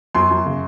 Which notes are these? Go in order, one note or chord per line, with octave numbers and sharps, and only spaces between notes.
F#2 C6
F#2
C#3